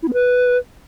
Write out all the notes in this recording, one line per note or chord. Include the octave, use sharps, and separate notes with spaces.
E4
B3
B4